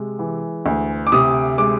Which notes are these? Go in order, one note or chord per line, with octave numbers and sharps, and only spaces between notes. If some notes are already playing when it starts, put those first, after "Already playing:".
Already playing: C3 G#3
E3
D2
D6
C3 D#6
G#3 D6